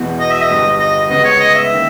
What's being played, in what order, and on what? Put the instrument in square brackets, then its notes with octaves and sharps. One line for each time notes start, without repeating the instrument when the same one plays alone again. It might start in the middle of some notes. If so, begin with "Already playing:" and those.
Already playing: [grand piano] E1 E2 B2
[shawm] D#5
E5
D#5
[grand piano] G1 G2 G3
[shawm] D#5
[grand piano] C#2 C#3 G#3 B3 [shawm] D#5
[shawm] C#5
D#5
E5
[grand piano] D#3 A#3